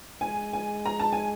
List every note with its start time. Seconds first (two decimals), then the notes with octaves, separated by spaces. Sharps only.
0.21 G#3 G#5
0.53 G#5
0.86 A#5
1.00 A5
1.13 G#5